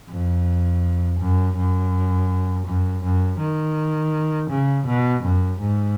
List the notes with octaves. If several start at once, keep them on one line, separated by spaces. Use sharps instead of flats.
F2
F#2
F#2
F#2
F#2
D#3
C#3
B2
F#2
G#2